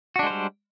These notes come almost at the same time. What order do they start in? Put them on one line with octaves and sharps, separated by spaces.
F#4 D4 G#3 C5 G3